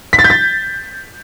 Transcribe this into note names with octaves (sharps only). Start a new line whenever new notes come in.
B6
A6
G6
A6